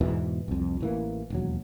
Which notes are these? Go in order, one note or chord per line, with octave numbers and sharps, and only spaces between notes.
E2 G#2 B2 E3
C2 F2
A1 E3 A#3
E1 D#2 F#3